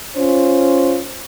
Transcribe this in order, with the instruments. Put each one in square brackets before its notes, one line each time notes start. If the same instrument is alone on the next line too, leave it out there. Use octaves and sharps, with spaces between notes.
[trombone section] C#4 F4 C5